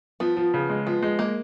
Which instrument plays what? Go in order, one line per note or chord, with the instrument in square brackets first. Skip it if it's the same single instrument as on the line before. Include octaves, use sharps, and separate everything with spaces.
[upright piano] F3 [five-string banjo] B3
[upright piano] F3
C#3
G#3
[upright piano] F3 [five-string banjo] B3
[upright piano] G#3
[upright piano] G#3 [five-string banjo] A#3